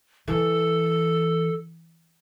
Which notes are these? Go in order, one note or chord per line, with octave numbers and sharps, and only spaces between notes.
E3 A4